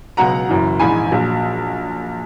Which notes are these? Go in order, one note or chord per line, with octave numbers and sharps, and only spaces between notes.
C#2 B2 F#3 F#5 A#5
F#1 F#2 E3
A#1 G#2 E3 G#5 B5
A#1 A#2 F#3